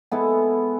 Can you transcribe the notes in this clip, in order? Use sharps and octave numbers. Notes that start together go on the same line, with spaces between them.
G#3 B3 E4 A4